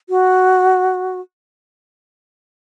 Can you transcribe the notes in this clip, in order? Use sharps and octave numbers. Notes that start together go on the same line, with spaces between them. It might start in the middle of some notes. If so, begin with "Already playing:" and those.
F#4